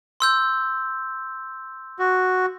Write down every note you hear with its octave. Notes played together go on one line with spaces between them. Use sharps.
C6 E6 G6
F#4